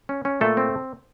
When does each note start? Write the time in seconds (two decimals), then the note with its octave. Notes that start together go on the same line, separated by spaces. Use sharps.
0.09 C#4
0.25 C#4
0.41 A#2 A3 A4
0.57 C4